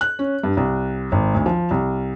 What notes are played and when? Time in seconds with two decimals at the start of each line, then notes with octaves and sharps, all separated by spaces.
0.01 F#6
0.19 C#4
0.44 G2
0.57 C2
1.12 G#1
1.35 D2
1.46 F3
1.71 C2